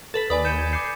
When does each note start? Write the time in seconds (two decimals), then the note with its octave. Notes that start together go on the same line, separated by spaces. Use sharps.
0.14 A4 B4 A6 B6
0.30 D#2 B4 D5 G#5 B5 D#6
0.45 G6 C#7 D#7 E7
0.59 G#6
0.73 D6 G6 C7 C#7